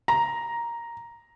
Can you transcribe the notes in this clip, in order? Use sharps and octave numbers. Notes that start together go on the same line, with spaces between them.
A#5